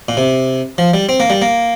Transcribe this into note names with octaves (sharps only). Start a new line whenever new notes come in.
A#2
C3
F3
G3
C4
A#3
G3
A#3